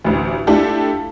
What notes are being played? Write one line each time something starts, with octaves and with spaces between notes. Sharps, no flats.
A1 D2
A3 D4 E4 F4 G4 A4